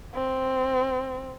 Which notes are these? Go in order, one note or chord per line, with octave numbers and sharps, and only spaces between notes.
C4